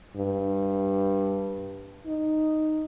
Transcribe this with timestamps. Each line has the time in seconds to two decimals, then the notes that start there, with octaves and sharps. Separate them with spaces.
0.16 G2
2.07 D#4